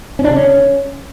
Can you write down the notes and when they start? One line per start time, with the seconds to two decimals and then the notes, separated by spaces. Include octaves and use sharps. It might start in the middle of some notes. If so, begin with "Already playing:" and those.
0.19 C#4
0.24 D4
0.30 C#3
0.35 C#4